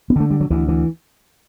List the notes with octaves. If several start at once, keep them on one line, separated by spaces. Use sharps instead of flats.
B3
D3 A3
G3
F#3
D2 E3
E3